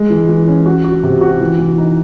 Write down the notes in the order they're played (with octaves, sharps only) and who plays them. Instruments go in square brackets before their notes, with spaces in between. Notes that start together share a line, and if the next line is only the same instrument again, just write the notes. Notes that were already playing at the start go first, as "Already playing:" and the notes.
Already playing: [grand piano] G#3
E3
E3
C#4
F#4
F#4
C3
F#4
E3
E3
D#4